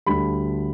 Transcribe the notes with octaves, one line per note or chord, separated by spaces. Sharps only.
D2 D3 G3 B5